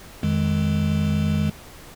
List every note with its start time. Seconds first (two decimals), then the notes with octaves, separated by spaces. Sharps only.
0.23 F2 D#3 G#3